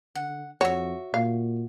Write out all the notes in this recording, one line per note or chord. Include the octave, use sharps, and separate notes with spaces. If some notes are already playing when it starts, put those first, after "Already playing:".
D3 F#5
F2 F#4 C#5 E5
A#2 F5